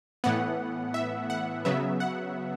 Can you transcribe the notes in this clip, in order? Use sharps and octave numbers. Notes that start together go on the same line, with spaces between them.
A2 E3 B3 F#5
E5
F#5
C#3 F#3 B3 E5
F#5